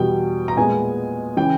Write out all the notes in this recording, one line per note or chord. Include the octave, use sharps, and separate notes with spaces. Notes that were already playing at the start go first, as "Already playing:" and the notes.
Already playing: E2 B2 G3 G5
A#5
A#2 G#3 B3 G#5
C#3 E3 G5